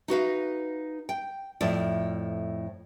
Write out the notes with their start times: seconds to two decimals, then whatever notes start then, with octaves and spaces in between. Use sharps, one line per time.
0.08 D#4 F#4 B4 F5
1.09 G5
1.61 F2 A2 F4 D5